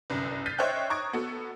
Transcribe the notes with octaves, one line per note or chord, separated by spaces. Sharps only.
G1 C2 F#2
F6 G6 A6 B6 C7 D#7
C5 C#5 D#5 E5 G5 F#6
A#5 C#6 D#6 G#6 D7
B3 F#4 A4